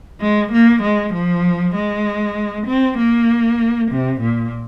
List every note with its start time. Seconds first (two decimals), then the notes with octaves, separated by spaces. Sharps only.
0.20 G#3
0.52 A#3
0.82 G#3
1.14 F3
1.75 G#3
2.66 C4
2.98 A#3
3.91 C3
4.20 A#2